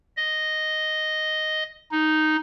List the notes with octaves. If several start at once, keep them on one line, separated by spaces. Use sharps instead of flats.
D#5
D#4